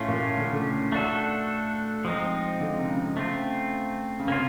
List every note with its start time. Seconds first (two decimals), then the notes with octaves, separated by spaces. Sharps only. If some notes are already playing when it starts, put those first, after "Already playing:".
Already playing: A2 A3 C#4 F4
0.08 A#2
0.37 D3
0.44 C#3
0.52 D3
0.92 A3 D4 F#4 A4
2.05 F3 G#3 C4 D#4
2.60 D3
2.78 C3
2.88 C#3
3.17 A3 C4 F4
4.20 C#3
4.28 C3 A#3 C#4 F4